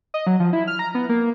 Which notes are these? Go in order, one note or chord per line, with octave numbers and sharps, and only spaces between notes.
D#5
F#3
F3
E4
F6
A#5
B3
A#3